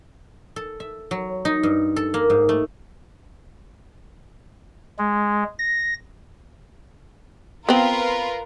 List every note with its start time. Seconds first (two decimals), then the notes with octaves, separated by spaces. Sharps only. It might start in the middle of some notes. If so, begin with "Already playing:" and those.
0.56 A4
0.80 E5
1.11 F#3
1.45 D#4
1.63 G2
1.96 A4
2.14 A#3
2.30 G#2
2.49 A3
4.99 G#3
5.59 A#6
7.69 B3 C4 F4 A#4 B4